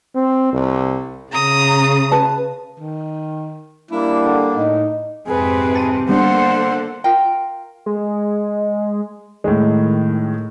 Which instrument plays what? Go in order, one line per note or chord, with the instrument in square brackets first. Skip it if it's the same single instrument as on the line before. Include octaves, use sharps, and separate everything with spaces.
[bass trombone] C4
C2
[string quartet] C#3 [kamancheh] A#5 D#6
[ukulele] B4 A5
[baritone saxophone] D#3
[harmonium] G3 A#3 D4 [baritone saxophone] E4
[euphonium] D3
[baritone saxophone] A2 [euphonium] D#4
[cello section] F2 G#2 C3 [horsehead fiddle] G#4 B4
[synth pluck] A5 D#7
[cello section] D3 A#3 A4 [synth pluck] G3 B3 D4 [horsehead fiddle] C5 F#5
[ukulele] F4 A#4 G5
[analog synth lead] G#3
[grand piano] A2 G#3 [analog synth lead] D#3